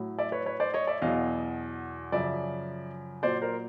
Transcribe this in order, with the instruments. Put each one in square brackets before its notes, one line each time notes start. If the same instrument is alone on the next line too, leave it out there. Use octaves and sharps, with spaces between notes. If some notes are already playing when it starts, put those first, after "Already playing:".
Already playing: [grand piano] A2 F#3
D5 E5
B4 C#5
B4 C#5
C5 D5
C#5 D#5
D5 E5
E2 B2 F#3 D#5 F5
F#2 C#3 F3 D5 E5
A#2 F#3 C5 D5
A#4 C5